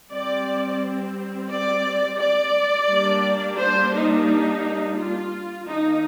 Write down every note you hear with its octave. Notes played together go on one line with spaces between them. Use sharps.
G3 C4 D5
D5
D5
G3 A#3 D4
C5
D#4
F4
D#3 A#3 D4 D#4